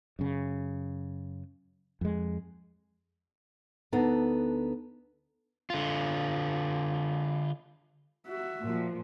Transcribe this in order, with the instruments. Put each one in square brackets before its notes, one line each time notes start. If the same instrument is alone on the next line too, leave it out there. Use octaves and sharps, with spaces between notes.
[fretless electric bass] F#2 C#3
F2 G#3
[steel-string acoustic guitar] D2 B3 D4 D#4 A4
[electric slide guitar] D3 F4
[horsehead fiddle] F#4 E5
[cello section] A#2 F3